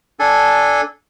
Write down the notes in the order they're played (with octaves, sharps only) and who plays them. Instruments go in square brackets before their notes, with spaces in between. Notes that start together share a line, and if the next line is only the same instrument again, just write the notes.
[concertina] D4 A4 G#5